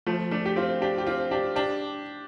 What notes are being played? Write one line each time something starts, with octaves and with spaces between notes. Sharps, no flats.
F3 A3
A3 D4
G4
C4 F4
D4 G4
G4
C4 F4
D4 G4
D4 G4